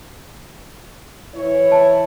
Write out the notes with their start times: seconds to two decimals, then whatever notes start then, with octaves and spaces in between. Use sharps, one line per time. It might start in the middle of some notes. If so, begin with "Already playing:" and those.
1.35 E3 E4 C#5
1.72 A5